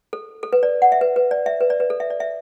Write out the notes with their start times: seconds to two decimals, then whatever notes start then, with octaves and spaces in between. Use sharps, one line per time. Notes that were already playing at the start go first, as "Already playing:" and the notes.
0.13 A4
0.43 A4
0.53 B4
0.63 D5
0.82 F#5
0.92 E5
1.01 B4
1.16 B4
1.31 D5
1.46 E5
1.61 B4
1.70 D5
1.80 B4
1.90 A4
2.00 E5
2.10 D5
2.20 E5